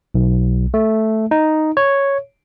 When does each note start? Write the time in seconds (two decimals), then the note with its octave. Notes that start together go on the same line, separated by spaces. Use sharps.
0.15 B1
0.74 A3
1.31 D#4
1.77 C#5